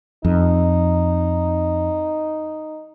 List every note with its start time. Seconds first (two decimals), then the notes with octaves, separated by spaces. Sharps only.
0.25 F2 D#4